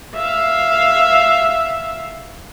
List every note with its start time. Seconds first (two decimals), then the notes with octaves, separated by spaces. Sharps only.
0.16 E5 F5